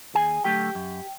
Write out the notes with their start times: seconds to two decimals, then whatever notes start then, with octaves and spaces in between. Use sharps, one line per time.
0.14 D#2 G#4 G#5
0.44 D3 F#3 A3 G4 G5
0.75 F#2